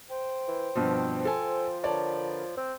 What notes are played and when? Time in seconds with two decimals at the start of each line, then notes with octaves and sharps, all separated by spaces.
0.10 C5 G5
0.48 E3
0.76 G2 B2 F3 C4
1.25 F3 A4 G#5
1.83 D3 A#4 B4 C#5 D5 A5
2.57 C4